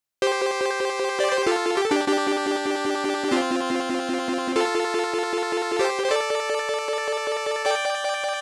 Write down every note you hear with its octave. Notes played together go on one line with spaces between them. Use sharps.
G4 C5
D5
C5
F4 A4
G4
A4
D4 G4
D4 G4
C4 F4
F4 A4
G4 C5
C5
A4 D5
D5 G5